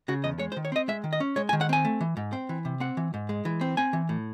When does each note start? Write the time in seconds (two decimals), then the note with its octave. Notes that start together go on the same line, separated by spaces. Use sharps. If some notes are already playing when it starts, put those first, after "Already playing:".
0.08 C#3 F#4
0.24 E2 D#5
0.39 G#3 C#5
0.52 C5
0.57 D#3
0.65 C#5
0.72 C4 D#5
0.88 G#3 E5
1.04 D#3
1.13 D#5
1.20 C#4
1.36 G#3 C#5
1.49 G#5
1.53 D#3
1.61 F#5
1.69 C4 G#5
1.85 A3
2.01 E3
2.17 G#2
2.33 C4
2.49 E3
2.65 C3
2.80 C4 F#5
2.97 E3
3.14 G#2
3.29 G#3
3.45 E3
3.61 C4
3.77 C4 G#5
3.93 E3
4.09 A2